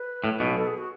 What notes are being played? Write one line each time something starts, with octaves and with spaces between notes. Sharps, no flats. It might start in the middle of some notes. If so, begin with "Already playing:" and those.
Already playing: B4
A2
B1 B2
A4
G#4
F#4